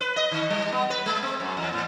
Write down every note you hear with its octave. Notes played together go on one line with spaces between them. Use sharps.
B4
D#5
D#3
G3
B3
B4
G#3
C4
F#2
E2
A2